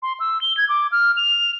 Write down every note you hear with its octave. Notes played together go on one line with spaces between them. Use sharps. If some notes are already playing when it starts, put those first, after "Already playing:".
C6
E6
G7
G#6
D6
F6
F7